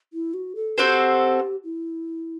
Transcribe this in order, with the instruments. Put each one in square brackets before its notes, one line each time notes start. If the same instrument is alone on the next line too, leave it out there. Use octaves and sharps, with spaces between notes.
[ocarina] E4
F#4
A4
[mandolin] C4 F#4 A4 C5 [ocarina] G4
[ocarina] E4